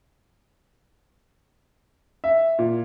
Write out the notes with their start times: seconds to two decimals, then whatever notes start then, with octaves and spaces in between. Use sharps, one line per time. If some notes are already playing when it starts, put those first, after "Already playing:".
2.24 E5
2.59 A#2